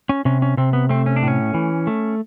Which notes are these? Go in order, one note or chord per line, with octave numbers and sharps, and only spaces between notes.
C#4
C3 C#4
C#4
C3 C4
B3
A3 C4
C#4
D4
A2 C#4
E3
A3